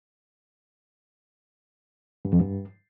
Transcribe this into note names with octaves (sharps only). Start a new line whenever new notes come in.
G2
F2
G2